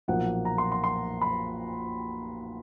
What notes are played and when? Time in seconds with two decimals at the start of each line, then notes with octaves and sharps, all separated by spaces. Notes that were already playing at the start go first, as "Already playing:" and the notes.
0.08 B1 A#2 F3 A#3 F#5
0.45 A#5
0.58 C6
0.72 C6
0.84 C6
1.21 B5